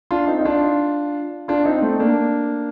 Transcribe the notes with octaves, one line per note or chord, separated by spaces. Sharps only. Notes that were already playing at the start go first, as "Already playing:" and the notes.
D4 F4
C4 D#4
D#4
D4 F4
D4 F4
C4 D#4
A3 C4
A#3 D4